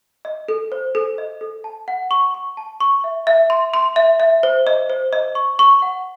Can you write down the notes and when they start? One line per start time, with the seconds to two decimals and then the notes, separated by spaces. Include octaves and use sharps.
0.25 D#5
0.48 A4
0.72 C5
0.95 A4
1.18 D#5
1.41 A4
1.64 A5
1.88 F#5
2.11 C#6
2.34 C#6
2.57 A5
2.80 C#6
3.04 E5
3.27 E5
3.50 C6
3.74 C6
3.96 E5
4.20 E5
4.43 C5
4.67 D#5
4.90 C5
5.13 D#5
5.35 C#6
5.59 C#6
5.82 F#5